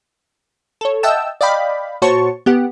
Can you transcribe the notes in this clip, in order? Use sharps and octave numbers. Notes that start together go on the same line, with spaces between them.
A4 C#5
D#5 E5 F#5 G5 A5 E6
D5 D#5 F5 G5 B5
A#2 F#4 C5 C#5 A5 C#6
B3 G4 F#5